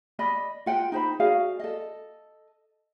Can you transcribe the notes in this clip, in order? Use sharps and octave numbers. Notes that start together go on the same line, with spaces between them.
D5 D#5 B5
F4 F#5 G5
D#4 C5 B5
F#4 G#4 D5 F5
A4 D#5